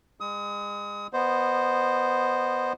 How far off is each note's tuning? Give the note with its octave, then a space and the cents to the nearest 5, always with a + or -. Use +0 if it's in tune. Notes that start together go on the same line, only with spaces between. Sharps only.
G#3 -35 D#6 +30
B3 +0 C5 +0 D#5 -25